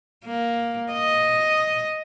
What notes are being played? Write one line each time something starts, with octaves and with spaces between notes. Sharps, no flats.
A#3
D#5